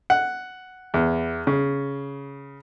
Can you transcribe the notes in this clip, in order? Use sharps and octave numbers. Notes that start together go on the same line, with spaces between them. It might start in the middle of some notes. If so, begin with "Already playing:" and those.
F#5
E2
C#3